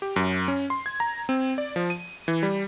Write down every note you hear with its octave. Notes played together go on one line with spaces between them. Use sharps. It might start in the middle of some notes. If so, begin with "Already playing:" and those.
G4
F#2
C#4
C6
G#6
A#5
C4
D5
F3
D#7
E3
G3